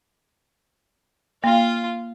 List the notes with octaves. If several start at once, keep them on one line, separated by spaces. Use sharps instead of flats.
A#3 F4 F5